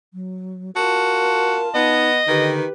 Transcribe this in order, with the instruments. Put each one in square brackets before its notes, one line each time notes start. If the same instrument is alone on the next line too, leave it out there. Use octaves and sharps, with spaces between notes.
[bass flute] F#3
[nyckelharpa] F4 A5 [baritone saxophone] F#4 [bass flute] A#4
[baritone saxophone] B3 [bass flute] D#4 [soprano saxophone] D#5
[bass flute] D3 [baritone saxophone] D#3 [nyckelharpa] G4 B4